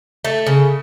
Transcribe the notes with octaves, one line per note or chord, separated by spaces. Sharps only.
A3
C#3